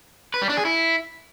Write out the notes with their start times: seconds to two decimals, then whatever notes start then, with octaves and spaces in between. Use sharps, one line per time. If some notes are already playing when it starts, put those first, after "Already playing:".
0.34 B4
0.42 G3
0.49 D4
0.57 G#4
0.65 E4